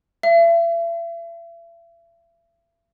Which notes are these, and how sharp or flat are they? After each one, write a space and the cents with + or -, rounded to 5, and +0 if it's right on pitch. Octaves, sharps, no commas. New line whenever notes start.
E5 +40